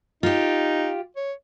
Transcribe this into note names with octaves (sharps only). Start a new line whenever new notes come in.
D#4 F4 G4
C#5